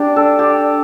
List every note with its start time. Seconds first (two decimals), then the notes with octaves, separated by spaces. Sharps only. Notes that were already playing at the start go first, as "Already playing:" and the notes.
Already playing: D4 G4
0.16 A4
0.39 G4